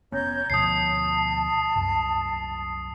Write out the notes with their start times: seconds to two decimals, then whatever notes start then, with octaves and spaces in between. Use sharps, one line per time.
0.12 F1 B3 C#4 C#5 A#5 G6
0.50 D2 B2 F3 A5 D#6 C7
1.76 C2 F#2